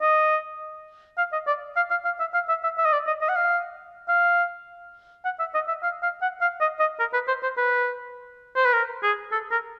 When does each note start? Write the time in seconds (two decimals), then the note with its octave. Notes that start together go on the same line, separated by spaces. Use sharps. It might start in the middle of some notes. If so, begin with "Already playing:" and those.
0.02 D#5
1.18 F5
1.33 D#5
1.47 D5
1.76 F5
1.90 F5
2.05 F5
2.20 E5
2.34 F5
2.49 E5
2.63 E5
2.78 E5
2.86 D#5
2.93 D5
3.07 D#5
3.21 D#5
3.29 F#5
3.36 F5
4.08 F5
5.25 F#5
5.39 E5
5.54 D#5
5.68 E5
5.83 F5
6.02 F5
6.22 F#5
6.41 F5
6.60 D#5
6.80 D#5
6.99 A#4
7.14 B4
7.28 C5
7.43 C5
7.57 B4
8.56 C5
8.65 B4
8.73 A#4
9.03 G#4
9.32 A4
9.51 A#4